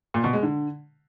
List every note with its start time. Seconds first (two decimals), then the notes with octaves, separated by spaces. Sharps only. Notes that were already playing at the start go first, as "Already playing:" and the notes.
0.14 A#2
0.24 B2
0.33 G#3
0.43 D3